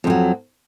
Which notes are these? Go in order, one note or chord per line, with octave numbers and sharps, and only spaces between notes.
F2 D#3 F#3